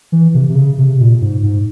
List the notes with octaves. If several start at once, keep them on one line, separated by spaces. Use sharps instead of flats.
E3
C3
C3
C#3
C3
A#2
G#2
G#2